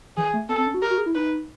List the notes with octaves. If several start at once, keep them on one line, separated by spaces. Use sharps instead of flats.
E3 G#4
A3
B3 A4
C4
C#4
F#4
G4 A#4
F#4
G#4
E4
D#4 B4